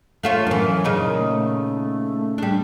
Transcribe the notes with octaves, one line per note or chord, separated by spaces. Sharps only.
A3 F4 C#5
F#2 E3 A#4
A#2 C#3 D#4
A3
G3 D4